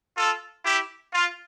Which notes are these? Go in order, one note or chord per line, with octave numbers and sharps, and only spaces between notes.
F4 A4
E4 G4
F4